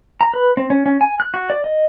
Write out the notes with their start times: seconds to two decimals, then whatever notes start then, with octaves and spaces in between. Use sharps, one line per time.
0.21 A#5
0.34 B4
0.57 C4
0.70 C#4
0.86 C#4
1.01 G#5
1.20 F#6
1.34 F#4
1.50 D5
1.64 D#5